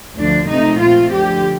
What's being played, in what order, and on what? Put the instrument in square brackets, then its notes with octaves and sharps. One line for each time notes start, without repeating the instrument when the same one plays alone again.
[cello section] D2 D3 F3 D4
C3 F3 A3 C4 D#4
A#2 A3 C4 F4
D2 D3 F3 G4